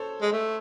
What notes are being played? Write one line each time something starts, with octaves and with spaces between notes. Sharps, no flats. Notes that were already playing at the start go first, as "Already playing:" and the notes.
Already playing: A4 C5 C#5
G#3
A3